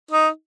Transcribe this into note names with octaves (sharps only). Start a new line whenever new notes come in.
D#4